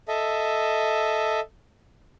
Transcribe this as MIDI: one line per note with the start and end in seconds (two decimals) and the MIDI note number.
0.08 1.40 69
0.08 1.40 75
0.08 1.40 76